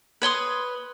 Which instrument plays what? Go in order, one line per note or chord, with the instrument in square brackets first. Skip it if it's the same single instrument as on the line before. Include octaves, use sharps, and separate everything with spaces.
[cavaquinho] B4 C#5 C6 D#6